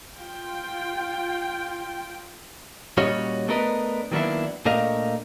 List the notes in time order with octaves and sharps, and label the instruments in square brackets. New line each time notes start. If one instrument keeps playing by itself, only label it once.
[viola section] F4 G5
[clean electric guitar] A#2 G3 C#4 F#4 C#5 D#5
A3 B3 D4 A#4 B4 D#5
D#3 F#3 A#3 B3 D4 E4
A#2 A3 D4 A#4 D#5 F5